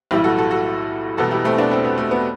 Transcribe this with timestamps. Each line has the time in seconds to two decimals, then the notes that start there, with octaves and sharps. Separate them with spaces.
0.11 B1 A2 E3 G3 E4 G4
0.24 F#4 A4
0.38 F#4 A4
0.51 F#4 A4
1.17 E1 E2 B2 G3 F#4 A4
1.31 E4 G4
1.44 A3 C4
1.58 B3 D4
1.71 C4 E4
1.85 B3
1.98 A3
2.11 B3